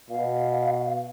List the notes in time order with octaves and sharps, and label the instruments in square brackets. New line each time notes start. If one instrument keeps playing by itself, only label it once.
[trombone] B2 [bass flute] F5